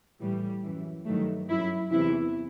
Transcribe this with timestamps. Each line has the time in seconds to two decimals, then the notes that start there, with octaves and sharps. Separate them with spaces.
0.20 A2 E3 G3
0.63 F#2 E3
1.05 G2 D#3 F#3 A3
1.48 F#2 F#3 E4
1.91 E2 C3 E3 E4